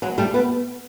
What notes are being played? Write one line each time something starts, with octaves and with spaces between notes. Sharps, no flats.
F#3 G#3
G3 A3
A3 B3